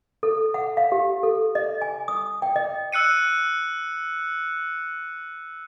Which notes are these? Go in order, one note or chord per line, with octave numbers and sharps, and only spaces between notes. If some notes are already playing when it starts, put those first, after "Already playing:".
A4
F#5
F5
G4
A4
D#5
G#5
D#6
G5
D#5
E6 F#6 C#7 D#7